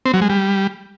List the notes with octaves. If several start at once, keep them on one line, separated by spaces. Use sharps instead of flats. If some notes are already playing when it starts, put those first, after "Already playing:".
C4
F#3
G#3
G3